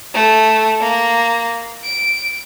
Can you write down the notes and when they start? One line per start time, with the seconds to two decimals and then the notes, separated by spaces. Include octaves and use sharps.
0.15 A3
0.81 A#3
1.84 D7